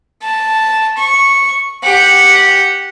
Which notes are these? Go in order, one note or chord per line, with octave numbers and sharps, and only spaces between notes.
A5
C#6
G4 F#5